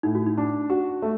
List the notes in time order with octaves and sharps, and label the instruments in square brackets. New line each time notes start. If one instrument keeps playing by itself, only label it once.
[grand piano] A2 [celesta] D#4
[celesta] F#4
D#4
[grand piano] D4
F#4
A3